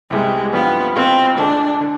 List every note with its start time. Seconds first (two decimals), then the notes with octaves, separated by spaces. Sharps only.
0.10 C2 C3 G3 G#3 B3
0.53 G2 D3 F3 B3 C4 F4
0.96 B2 B3 C4 F4
1.38 D2 D3 G#3 D4
1.81 D3